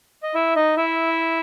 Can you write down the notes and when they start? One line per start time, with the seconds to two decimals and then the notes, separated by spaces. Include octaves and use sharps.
0.23 D#5
0.34 E4 E5
0.56 D#4 D#5
0.77 E4 E5